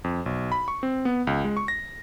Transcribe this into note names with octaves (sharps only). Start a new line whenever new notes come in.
F2
B1
B5
C#6
C4
B3
C#2
G#3
C#6
A#6